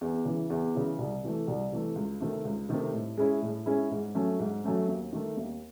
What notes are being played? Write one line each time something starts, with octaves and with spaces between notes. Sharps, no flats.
E2
C#3 E3
E2
C#3 E3
C2
C3 E3 A3
C2
C3 E3 A3
C#2
C3 D#3 A3 C4
C#2
C3 D#3 A3 C4
A2
G#3 C#4 E4
A2
G#3 C#4 E4
G#2
F#3 A3 C#4
G#2
F#3 A3 C#4
D#2
D#3 A3
D#2